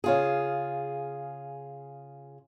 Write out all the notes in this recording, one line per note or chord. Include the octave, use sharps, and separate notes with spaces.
C#3 F4 G#4